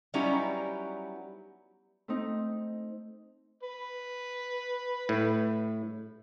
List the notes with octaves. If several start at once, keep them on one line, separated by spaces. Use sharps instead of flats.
F#3 G3 B3 C#4 D#4 E4
A3 C4 D#4
B4
A2